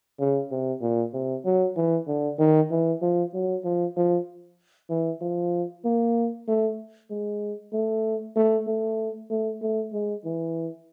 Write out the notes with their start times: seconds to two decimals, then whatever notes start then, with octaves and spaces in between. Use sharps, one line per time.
0.20 C#3
0.51 C3
0.81 A#2
1.14 C3
1.45 F#3
1.77 E3
2.08 D3
2.39 D#3
2.71 E3
3.02 F3
3.34 F#3
3.64 F3
3.97 F3
4.90 E3
5.22 F3
5.85 A#3
6.48 A3
7.11 G#3
7.73 A3
8.36 A3
8.67 A3
9.30 A3
9.62 A3
9.93 G#3
10.25 E3